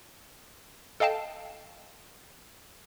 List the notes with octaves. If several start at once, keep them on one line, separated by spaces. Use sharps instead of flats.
A4 D#5 F5 G5 A5